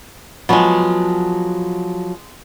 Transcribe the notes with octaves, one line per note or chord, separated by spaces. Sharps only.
F3 F#3 G#3 B3